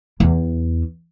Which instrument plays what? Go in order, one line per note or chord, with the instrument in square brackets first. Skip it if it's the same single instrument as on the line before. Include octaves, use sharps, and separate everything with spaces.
[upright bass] E2 E4